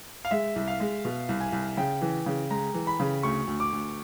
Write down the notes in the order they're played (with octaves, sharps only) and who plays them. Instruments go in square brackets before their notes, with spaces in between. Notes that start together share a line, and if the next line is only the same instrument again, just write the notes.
[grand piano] F5
[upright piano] G#3 [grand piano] E5
[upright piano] C2
[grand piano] F5
[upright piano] G#3
B2
C2
[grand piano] G#5
[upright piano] C2
[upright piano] C#3 [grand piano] G5
[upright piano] E3
C#3
[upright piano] G#3 [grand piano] A#5
[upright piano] E3
[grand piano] B5
[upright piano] C#3
[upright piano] D2 [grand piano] C#6
[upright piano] D2
[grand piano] D6
[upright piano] D2